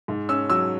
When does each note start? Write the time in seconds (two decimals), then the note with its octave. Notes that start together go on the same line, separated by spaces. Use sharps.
0.08 G#2
0.29 C#4 E6
0.50 F#3 E6